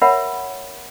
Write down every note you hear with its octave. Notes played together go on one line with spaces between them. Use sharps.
A#4 C#5 E5 F#5 B5